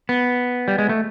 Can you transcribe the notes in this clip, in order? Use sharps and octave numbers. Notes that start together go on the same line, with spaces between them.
B3
G3
G#3
A3